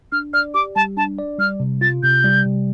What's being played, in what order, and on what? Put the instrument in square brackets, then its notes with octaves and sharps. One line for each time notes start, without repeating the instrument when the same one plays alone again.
[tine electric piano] D4 [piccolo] F6
[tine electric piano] D5 [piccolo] F6
[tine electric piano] G4 [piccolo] D6
[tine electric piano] G3 [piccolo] A5
[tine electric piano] D4 [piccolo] A5
[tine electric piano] D5
[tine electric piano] G3 [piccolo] F6
[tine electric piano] C3
[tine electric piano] F4 [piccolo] A6
[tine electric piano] C3 [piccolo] G6
[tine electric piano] G3
C3